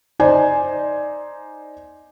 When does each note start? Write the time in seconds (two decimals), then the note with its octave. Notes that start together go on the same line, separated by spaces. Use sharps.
0.19 D#4 C5 D5 G#5